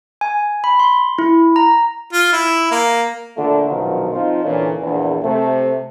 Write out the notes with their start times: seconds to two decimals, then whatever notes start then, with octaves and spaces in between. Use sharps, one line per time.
0.21 G#5
0.64 B5
0.79 C6
1.19 E4
1.56 A#5
2.13 F4
2.33 E4
2.71 A#3
3.37 A#2 D3 A3
3.69 A#1 F#2 B2 D#3 F3 F#3
4.12 F3 C4 D#4 F4
4.44 A#2 D3 E3 C#4
4.81 A#1 E2
5.24 C3 A3